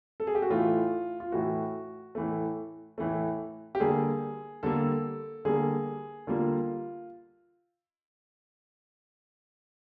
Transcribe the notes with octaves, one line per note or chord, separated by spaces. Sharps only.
A4
G#4
G4
F#4
A2 E3 A3 F4
F4
A2 E3 A3 F#4
A2 E3 A3
A2 E3 A3
G4
D3 G3 A#3 G#4
D3 G3 A#3 A4
D3 G3 A#3 G#4
D3 G3 A#3 F4